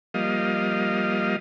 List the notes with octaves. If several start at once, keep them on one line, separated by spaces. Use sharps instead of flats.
F3 G3 A#3 D#5 F5